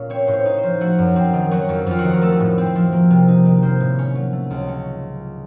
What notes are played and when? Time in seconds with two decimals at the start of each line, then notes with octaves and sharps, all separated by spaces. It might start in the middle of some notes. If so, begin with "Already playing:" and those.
Already playing: A#2 C#4 F5
0.10 C4 C#5
0.27 A2 C5
0.33 C#5
0.46 D#4
0.58 C5
0.63 F3
0.81 A3 F#4
0.99 F#2
1.16 C4
1.33 D#3
1.51 F#3 F#4
1.69 F2
1.86 F2 F4
1.99 F#4
2.04 D#3
2.13 A#4
2.21 A3 A4
2.40 A2
2.58 C4
2.75 F3
2.92 A#3
3.11 C3
3.28 D#4
3.45 D#3
3.62 A#3 C5
3.80 A2
3.99 C#4
4.15 F#3
4.33 A3
4.50 C#2
4.68 C#4